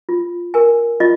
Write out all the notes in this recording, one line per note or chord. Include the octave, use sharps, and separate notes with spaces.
F4
A#4 G#5
F4 D#5